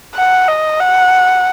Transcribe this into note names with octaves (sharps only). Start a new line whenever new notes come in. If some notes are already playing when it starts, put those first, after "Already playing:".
F#5
D#5
F#5